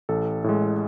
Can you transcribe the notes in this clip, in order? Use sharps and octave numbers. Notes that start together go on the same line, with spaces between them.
A1 A4
A2 G#3